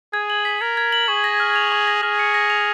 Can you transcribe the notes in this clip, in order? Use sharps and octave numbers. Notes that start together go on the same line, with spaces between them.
G#4 G#6
F#7
B6
A#4 G#6
G#6
F#7
G#4 C#6
A#6
F6
F7
C#6
A#6
G#4 F6
C#7
A#6
F7